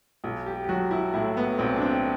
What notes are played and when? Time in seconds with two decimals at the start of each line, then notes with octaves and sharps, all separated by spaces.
0.24 B1
0.46 G4
0.64 G4
0.69 F#3 F#4
0.91 E4
1.14 A2 E4
1.37 B3
1.58 B1 C4
1.76 D4
1.82 C4